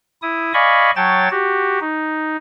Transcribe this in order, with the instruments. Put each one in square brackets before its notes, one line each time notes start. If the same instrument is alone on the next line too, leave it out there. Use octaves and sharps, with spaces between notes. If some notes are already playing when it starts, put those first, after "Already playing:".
[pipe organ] E4 D#6
D5 D#5 F5 G#5 B5 C#6
F#3 C#5 G5 A5 A6
F#4 G4
D#4